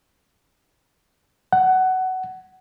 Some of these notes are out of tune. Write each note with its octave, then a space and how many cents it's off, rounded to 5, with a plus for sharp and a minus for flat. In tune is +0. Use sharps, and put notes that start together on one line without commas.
F#5 +15